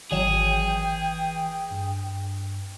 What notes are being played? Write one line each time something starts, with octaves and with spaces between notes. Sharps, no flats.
G#1 E3 F#3 G#4 G5 E7
G2